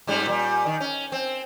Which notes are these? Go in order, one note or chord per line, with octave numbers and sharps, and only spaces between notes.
G#2 G3 C#4
A#2 G3
D#3
C#4
C4